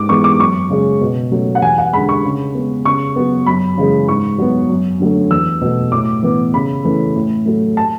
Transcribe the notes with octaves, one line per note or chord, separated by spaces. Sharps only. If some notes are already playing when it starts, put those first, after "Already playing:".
Already playing: G#2 D6
E3 G#3 B3 C#6
D6
F#2 C#6
C#3 G#3 C#4
B2
F#3 A3 C#4
F#5
E2 G#5
F#5
D3 G#3 B5
C#6
C#3
G#3 B3
C#3 C#6
F#3 B3
F#2 B5
C#3 E3 G#3
G#2 C#6
F#3 B3
F#2
D3 F#3 A3
E2 E6
B2 A3
A2 D6
E3 B3
C#3 B5
E3 A3 C#4
A2
F#3 A3
A5